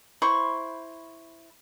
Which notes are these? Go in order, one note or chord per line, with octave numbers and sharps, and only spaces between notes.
E4 C5 B5 C#6